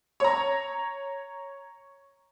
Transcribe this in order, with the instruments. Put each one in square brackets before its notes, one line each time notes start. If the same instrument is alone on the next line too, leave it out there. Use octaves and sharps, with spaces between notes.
[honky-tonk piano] C#5 A#5